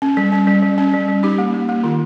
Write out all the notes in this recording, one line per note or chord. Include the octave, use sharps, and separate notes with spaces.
C#4
G3
C#4
G3
G3
C#4
G3
G3
D#4 G4
A#3
A#3
A#3
D#3 F4